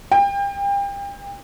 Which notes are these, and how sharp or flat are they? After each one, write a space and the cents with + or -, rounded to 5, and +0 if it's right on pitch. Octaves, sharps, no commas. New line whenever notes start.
G5 +35